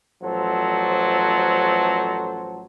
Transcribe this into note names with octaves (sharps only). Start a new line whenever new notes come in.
A1 F3 F#3 A4 C5